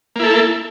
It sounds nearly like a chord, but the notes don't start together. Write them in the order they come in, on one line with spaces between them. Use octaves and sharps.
A#3 E4 A4